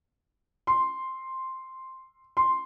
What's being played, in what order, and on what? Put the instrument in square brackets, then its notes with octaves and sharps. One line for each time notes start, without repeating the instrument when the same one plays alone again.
[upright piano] C6
C6